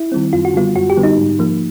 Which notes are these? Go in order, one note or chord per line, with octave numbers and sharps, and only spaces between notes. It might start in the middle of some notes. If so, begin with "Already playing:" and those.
Already playing: E4
D#3 G3 C4
F#2 F4
F#4
D3 G3 B3 F4
F#2 F#4
G4
D3 G3 B3
D#4
G#2
F3 A#3